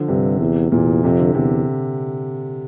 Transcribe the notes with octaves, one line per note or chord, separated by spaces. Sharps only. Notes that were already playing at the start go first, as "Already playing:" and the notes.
Already playing: D3 F3
G2 C3
E2
E2 A#2
F2 C3
D3
E2 C3